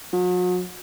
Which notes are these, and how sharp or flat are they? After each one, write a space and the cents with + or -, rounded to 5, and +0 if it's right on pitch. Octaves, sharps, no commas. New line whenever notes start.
F#3 -40